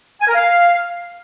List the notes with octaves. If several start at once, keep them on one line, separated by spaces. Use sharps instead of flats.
G#5
A#4
F5